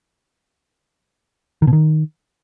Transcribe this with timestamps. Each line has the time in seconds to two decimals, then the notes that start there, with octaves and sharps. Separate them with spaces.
1.62 D#3
1.67 B2
1.73 D#3